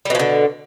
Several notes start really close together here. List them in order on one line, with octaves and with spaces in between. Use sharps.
G3 B2 F3 D3